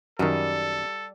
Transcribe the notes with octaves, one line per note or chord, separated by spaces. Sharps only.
F#2 D#3 G3 A4